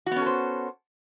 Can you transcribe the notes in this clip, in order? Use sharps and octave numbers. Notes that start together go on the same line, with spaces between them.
B3 C#4 F#4 A4 C5